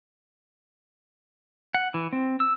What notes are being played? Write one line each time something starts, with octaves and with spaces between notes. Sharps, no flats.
F#5
E3
C4
E6